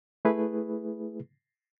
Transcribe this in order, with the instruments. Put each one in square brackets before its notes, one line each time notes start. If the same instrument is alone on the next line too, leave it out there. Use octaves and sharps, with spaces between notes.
[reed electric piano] A3 E4 G#4 B4